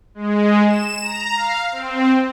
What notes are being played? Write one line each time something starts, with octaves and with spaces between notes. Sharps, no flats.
G#3
E7
A#5
F5
C4